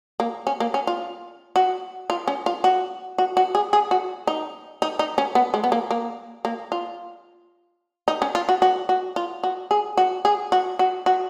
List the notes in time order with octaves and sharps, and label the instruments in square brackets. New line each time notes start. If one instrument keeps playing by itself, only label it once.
[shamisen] A#3
C#4
A#3
C#4
F4
F#4
F4
C#4
F4
F#4
F#4
F#4
G#4
G#4
F#4
D#4
D#4
D#4
C#4
B3
G#3
B3
A#3
A#3
A#3
F4
D#4
C#4
F4
F#4
F#4
F#4
F4
F#4
G#4
F#4
G#4
F#4
F#4
F#4